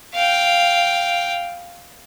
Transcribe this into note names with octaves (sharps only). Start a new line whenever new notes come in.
F5 G5